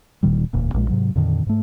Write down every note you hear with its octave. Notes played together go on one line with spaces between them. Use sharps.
D1 A#2 D#3 G3
E1 D2 A#2
A#1 A#2 G#3
G#2 C3 F#3
F2 A#2 D3 D#3
G#2 A3